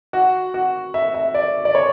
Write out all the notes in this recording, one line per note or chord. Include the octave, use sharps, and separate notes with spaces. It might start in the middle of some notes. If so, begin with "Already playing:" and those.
F#4
F#4
E5
E5
D5
D5
C#5